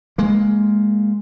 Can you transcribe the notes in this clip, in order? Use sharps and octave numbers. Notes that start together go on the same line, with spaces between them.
G#3 A#3